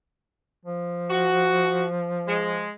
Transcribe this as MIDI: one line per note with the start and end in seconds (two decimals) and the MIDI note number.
0.65 2.65 53
1.10 1.85 66
2.27 2.71 56